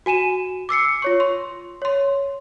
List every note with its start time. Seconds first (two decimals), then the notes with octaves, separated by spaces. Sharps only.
0.06 F#4 G#5 D#7 E7
0.69 D6 E6 C7 C#7
1.02 F4 C#5 C#6
1.20 C6
1.82 C#5 C6